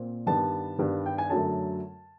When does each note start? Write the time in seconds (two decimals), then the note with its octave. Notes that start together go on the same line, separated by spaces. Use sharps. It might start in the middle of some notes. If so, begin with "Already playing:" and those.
Already playing: A#2 C4
0.26 G2 D#3 G3 B3 A5
0.78 G2 D#3 G3 B3
1.06 G5
1.18 G#5
1.30 F#2 D3 F#3 A3 A5